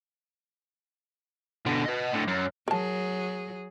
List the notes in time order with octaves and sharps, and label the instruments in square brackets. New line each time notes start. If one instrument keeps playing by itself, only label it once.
[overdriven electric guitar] B2 D3
B4 D#5
A2 D3
F#2
[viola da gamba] F#3 G#4 [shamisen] A#4 A5